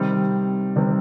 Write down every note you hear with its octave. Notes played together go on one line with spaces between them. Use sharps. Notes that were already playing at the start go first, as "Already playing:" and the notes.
Already playing: C3 D#3 G3 C4
C3 D#3 G3 C4